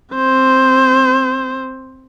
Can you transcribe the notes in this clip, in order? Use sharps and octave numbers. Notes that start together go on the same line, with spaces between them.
C4 C5